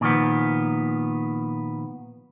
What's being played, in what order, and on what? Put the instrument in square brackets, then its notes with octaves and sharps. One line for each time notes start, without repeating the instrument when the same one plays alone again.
[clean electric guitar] A#2 D#3 F3 B3